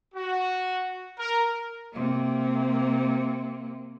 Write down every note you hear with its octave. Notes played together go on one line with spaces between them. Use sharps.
F#4
A#4
C3 A#3